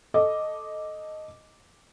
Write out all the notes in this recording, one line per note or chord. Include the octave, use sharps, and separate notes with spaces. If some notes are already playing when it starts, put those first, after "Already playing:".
A4 D#5 D6